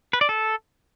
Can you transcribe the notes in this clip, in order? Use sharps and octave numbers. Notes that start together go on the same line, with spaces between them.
B4
D5
A4